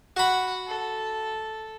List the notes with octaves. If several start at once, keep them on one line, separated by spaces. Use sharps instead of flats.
F#4 F#5 B5
A4